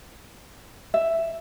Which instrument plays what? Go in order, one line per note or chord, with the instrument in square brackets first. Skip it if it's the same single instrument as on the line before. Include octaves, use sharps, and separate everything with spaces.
[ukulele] E5